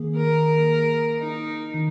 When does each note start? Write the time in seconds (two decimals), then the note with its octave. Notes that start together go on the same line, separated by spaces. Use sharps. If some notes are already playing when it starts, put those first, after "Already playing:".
Already playing: D#3 A#3 G#4
0.16 A#4
1.20 D#4
1.74 D#3